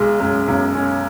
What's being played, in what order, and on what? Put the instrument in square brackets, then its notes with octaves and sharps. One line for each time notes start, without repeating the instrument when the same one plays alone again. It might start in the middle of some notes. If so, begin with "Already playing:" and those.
Already playing: [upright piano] B1 G#3
[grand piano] F#2 [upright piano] G#3
[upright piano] B1 [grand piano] F#2
[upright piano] C#4